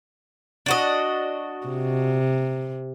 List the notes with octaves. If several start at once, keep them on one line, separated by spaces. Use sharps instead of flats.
D4 F#4 D#5
C3